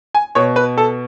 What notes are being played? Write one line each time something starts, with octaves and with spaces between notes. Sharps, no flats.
G#5
B2 C#5
B4
A4